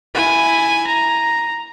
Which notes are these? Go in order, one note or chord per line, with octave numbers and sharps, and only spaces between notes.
E4 G#5
A#5